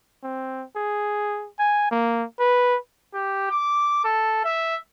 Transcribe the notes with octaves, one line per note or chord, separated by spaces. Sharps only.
C4
G#4
G#5
A#3
B4
G4
D6
A4
E5